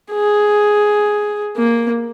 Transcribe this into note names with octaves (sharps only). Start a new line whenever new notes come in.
G#4
A#3